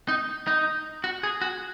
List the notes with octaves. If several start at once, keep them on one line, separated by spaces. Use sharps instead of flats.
D#4
D#4
F#4
G#4
F#4